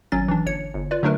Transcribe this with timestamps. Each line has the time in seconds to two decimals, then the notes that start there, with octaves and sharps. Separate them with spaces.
0.12 G#1 F#3 C#4 A6
0.28 E3 D4
0.46 G1 C#5 C#7
0.74 G1
0.91 F4 B4 D5
1.03 D3 F#3 A3 D4 A#4 B4